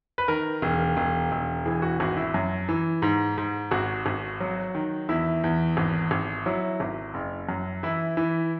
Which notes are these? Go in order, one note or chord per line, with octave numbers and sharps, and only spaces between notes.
B4
D#3 A#4
E1
E1
E1
E3 G#4
F#4
G#1 F#4
E4
F#2
E3
G#2
G#2
G#1 F#4
G#1
F#3
D#3
E2 E4
E2
G#1
G#1
F#3 E4
G#1
F#1
F#2
E3 E4
E3